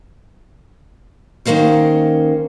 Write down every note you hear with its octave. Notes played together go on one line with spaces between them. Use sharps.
D#3 G#3 A#3 C#4 C5